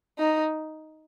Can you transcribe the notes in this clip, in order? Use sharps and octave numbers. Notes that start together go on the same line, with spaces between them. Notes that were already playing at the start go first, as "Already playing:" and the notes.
D#4